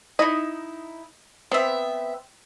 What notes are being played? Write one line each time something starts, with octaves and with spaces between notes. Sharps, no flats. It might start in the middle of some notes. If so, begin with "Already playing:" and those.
D#4 E4 D#5
B3 C4 E5